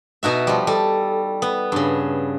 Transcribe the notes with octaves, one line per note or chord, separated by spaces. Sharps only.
B2 D#4 F#4 E5
F3 G3
G3 A4
B3
G2 C#3